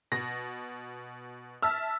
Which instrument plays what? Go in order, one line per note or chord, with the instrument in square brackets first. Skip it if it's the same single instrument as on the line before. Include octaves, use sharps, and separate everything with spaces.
[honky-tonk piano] B2 [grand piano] A#6
[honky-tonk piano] E5 A5 F6 [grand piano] E6